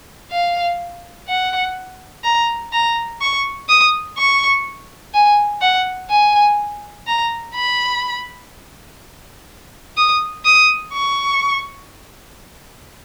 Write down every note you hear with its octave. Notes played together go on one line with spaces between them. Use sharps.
F5
F#5
A#5
A#5
C#6
D#6
C#6
G#5
F#5
G#5
A#5
B5
D#6
D#6
C#6